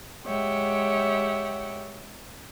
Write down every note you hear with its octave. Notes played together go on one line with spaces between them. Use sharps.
G#3 G4 C#5 E5 F#5 G5